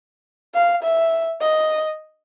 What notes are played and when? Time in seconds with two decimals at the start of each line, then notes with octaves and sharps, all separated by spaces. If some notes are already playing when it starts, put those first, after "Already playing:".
0.55 F5
0.83 E5
1.41 D#5